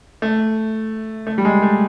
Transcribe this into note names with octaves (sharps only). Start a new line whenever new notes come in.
A3
A3
G3
G#3
A3